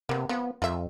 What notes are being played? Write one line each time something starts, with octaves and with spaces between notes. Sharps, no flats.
C3 A#3 B3
F3 B3
F2 F4 E5